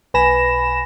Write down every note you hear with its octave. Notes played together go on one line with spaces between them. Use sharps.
B1 B4 G#5 B5 A#6 E7